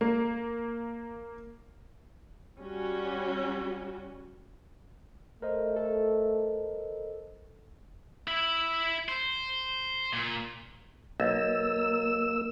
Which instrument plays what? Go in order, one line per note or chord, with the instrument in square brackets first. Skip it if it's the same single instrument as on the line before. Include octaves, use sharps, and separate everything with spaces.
[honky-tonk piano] A#3
[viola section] G3 C#4 F#4
[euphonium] A3 [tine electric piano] A#4 C5 D#5
[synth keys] A4
[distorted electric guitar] E4 E5
C5
A#2
[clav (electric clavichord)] B1 [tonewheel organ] A#3 E6